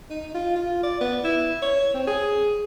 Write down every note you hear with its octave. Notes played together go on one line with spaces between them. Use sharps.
D#4
F4
F4
D5
B3
E4
C#5
C4
G#4